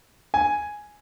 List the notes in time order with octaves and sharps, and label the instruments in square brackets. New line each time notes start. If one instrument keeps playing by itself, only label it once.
[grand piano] G#5